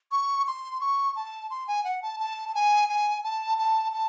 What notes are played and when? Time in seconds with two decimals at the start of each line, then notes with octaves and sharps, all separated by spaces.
0.12 C#6
0.47 C6
0.81 C#6
1.16 A5
1.50 C6
1.68 G#5
1.84 F#5
2.02 A5
2.20 A5
2.49 A5
2.55 G#5
2.89 G#5
3.24 A5
3.58 A5
3.93 A5